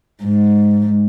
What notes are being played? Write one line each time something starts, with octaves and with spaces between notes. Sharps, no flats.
G#2